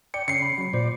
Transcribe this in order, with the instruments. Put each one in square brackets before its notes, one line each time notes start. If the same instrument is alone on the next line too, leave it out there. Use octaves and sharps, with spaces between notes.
[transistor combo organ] D5 G5 [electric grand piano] C#7
[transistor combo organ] C#3 [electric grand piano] C7 C#7
[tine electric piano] B5
[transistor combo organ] F#3
[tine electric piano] A#2 C5 [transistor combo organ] D5